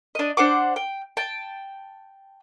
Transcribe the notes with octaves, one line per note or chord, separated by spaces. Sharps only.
D4 D#5
D4 C5 F#5 D6
G5
G5 A5